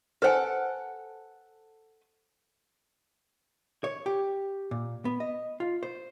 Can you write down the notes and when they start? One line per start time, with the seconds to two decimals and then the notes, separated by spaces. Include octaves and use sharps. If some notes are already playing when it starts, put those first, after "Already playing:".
0.22 A4 B4 C5 F#5 G#5
3.84 C#5
4.06 G4
4.71 A#2
5.05 B3
5.20 D#5
5.60 F4
5.83 C5